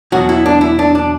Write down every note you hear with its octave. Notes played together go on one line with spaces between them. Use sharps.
E2 B2 F#3 F#4
E4
D4
E4
D4
D4